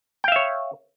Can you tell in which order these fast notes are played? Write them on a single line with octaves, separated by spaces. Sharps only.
G5 F5 E5 C#5